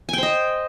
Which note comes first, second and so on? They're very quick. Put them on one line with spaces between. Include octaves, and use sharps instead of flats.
G#5 G5 C5 D#5